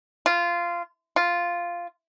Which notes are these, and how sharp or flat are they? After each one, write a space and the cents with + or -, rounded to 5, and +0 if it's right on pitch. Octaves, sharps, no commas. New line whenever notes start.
F4 -15
F4 -5